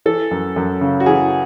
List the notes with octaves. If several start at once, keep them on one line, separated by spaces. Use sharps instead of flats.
E3 A4
F#2
F#2
C#3
F#4
E3 G#4